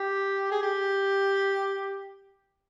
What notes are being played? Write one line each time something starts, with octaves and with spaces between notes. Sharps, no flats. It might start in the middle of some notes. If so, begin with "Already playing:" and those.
Already playing: G4
G#4
G4